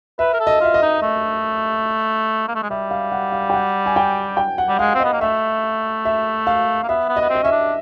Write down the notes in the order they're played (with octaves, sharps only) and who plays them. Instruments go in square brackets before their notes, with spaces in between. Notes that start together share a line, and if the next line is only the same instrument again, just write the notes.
[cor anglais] B4 [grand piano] E5
[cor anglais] A#4
A4
[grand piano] D#5
[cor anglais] F4 [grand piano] E5
[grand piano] D#5
[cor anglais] D#4
A3
A#3
A3
G#3
[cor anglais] G3 [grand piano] E5
[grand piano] F5
F#5
F5
G5
F#5
G#5
G5
G5
F#5
[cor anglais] G3
[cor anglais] G#3 [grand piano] F5
[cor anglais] C4
[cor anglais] B3 [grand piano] D#5
[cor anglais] A#3
[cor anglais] A3 [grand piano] E5
[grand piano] E5
F5
[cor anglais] A#3
[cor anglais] B3 [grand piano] E5
[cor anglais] B3
[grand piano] D#5
[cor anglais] B3
C4
[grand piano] D#5
[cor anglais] C#4 [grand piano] E5
[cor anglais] D4